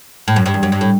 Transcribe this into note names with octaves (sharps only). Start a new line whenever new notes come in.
A2
F#2
G2
E2
F#2
G2
A2